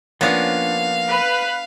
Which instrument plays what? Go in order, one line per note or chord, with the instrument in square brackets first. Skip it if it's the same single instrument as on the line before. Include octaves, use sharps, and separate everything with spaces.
[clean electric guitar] F3 A#3 C#4 [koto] B3 D4 [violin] F5
[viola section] B4 B5